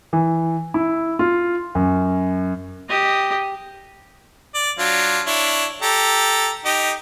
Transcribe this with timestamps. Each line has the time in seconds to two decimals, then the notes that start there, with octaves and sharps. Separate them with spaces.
0.13 E3
0.74 E4
1.19 F4
1.75 F#2
2.89 G4 D#5
4.55 D5
4.79 F#3 D4 F4
5.26 D4 E4 C#5
5.82 G4 A4 A#5
6.65 D#4 G4 D#5